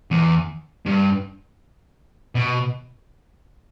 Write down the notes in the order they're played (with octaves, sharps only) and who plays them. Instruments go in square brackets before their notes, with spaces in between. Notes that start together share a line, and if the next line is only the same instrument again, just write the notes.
[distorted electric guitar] E2
G2
B2